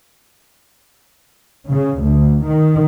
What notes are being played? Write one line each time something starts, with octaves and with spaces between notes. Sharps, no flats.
C#3
D2
D#3